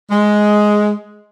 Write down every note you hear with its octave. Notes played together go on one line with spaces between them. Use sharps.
G#3